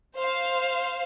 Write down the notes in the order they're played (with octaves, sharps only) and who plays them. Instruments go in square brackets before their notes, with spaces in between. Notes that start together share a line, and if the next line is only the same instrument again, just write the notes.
[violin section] C5 F5